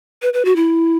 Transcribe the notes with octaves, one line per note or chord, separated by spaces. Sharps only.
B4
B4
F#4
E4